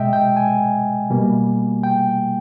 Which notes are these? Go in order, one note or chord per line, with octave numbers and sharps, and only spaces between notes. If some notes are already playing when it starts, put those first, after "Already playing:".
Already playing: B2 G#3 D#5 E5 G5
G5
G#5
B2 G3 A#3
G5